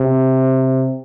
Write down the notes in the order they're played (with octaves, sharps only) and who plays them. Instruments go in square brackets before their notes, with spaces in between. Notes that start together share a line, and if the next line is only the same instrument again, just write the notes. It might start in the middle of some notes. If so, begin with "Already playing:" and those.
Already playing: [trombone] C3